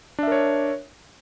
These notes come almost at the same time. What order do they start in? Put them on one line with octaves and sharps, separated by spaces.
D4 E5 A#4 C#5